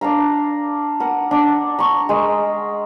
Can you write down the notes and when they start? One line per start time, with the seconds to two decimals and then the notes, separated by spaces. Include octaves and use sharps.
0.01 D4 A#4 F5 A#5
1.00 A#4 F#5
1.31 D4
1.79 A#5 C#6
2.09 G#3 A#4